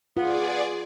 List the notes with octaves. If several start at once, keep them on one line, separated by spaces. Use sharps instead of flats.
B3 F4 G#4 D5